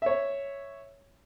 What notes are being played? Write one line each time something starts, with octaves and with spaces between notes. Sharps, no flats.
C#5 E5